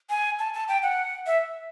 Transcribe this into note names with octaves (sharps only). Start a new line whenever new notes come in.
G#5
A5
A5
G5
F#5
E5